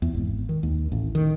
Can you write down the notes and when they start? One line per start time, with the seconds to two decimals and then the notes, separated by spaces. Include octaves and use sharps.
0.02 E2
0.14 G#1
0.49 D#3
0.63 D#2
0.92 A1
1.15 D#3